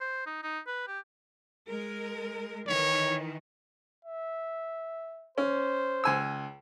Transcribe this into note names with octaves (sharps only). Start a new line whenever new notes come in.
C5
D#4
D#4
B4
G4
G#3 A#4
D#3 E3 C#5
E5
C#4 C5
C#2 G#5 E6